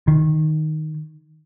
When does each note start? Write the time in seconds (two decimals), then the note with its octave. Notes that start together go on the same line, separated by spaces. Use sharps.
0.08 D#3